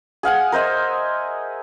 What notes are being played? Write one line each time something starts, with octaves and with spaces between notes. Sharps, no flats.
G#4 F5 F#5 G#5
A#4 C5 D#5 E5